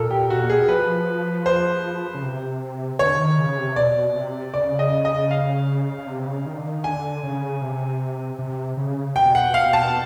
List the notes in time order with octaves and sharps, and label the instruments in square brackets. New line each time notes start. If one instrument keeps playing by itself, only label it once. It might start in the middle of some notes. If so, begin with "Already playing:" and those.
Already playing: [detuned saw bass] A#2 [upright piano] A4 A#4
[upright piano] G4
[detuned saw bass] B2 [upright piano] F#4
[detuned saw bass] A#2
[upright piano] G#4
[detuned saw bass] B2
[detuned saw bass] F3 [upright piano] B4
[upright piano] C5
[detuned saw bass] C#3
C3
[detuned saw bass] D3 [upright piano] C#5
[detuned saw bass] D#3
C#3
C3
[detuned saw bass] B2 [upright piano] D5
[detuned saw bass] C3
[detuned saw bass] C#3 [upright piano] D5
[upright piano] D#5
D#5
F5
[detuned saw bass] C#3
C3
C#3
D#3
D3
D#3
[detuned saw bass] D3 [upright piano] G#5
[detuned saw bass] C#3
C3
C3
C#3
[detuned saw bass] B2 [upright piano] G5
[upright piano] F#5
F5
A5